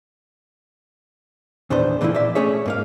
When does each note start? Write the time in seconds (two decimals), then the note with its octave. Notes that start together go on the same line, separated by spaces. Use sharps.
1.70 E2 A#2 D#3 B3 D4 C5
2.01 A2 D3 E3 F3 C4 E4
2.15 A#2 D5 E5
2.35 A3 C#4 G#4 C#5 E5
2.66 G#2 A#3 F5